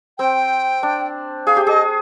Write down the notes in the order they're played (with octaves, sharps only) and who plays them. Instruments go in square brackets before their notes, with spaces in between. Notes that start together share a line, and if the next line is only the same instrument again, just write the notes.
[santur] C4 [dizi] G5
[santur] D4
[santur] G#4 [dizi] F5
[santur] G4
[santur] G#4 [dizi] D#5